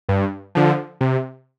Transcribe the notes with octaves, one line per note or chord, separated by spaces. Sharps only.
G2
D3 F3
C3